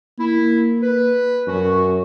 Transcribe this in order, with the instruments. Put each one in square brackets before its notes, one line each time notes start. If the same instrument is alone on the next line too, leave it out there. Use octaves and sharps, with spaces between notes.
[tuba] A#3 [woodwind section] E4
[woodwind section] B4
[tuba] F#2 [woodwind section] B2 C#4 F#4